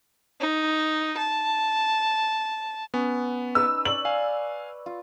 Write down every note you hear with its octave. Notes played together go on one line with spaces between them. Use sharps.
D#4
A5
B3 C#4
D#4 B4 E6
C#5 D5 F#7
F5 G#5
F4